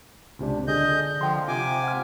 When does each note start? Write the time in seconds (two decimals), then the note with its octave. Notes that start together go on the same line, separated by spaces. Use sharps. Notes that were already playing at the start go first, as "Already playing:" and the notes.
0.39 C#2 C3 D4
0.68 D3 G#4 D#5 G6
1.21 D3 F3 G5 C6
1.48 C3 F4 G#5 D6
1.84 F#5 F6